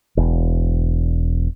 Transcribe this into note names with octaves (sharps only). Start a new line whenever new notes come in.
E1